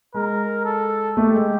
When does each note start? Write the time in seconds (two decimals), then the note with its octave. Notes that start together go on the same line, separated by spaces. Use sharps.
0.14 G#3 A#4
0.65 A4
1.16 A3 G4
1.34 G#3